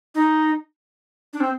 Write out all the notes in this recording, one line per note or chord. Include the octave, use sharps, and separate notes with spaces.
D#4
D4
C4